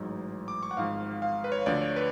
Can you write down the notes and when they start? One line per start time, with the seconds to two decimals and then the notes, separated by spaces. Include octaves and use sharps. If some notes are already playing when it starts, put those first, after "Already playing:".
Already playing: A1 G#2 F#3
0.48 D6
0.63 C#6
0.71 F#5
0.77 G#1 G#2 F3 F5
1.22 F5
1.44 B4
1.52 C#5
1.66 D2 D3 F3 D5
1.81 C#5
1.96 B4